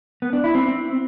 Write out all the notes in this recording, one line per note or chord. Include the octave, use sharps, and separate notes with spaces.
B3
D4
E4
C4